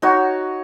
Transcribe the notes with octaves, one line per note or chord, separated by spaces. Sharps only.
D#4 F#4 C#5